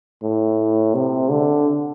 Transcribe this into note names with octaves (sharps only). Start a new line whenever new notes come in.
A2
C3
D3